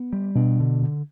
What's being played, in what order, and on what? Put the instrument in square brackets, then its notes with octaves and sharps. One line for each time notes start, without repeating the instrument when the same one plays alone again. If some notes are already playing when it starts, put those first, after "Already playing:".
Already playing: [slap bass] B3
G3
[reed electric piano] B2 [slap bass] D4
[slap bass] D3
D3